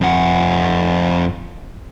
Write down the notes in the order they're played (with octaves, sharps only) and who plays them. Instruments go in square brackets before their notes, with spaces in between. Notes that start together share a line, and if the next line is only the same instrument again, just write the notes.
[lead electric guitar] F2 F#5